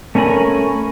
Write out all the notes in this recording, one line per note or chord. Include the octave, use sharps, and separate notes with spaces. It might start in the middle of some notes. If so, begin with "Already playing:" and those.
A3 C#4 A#4 G#5 B5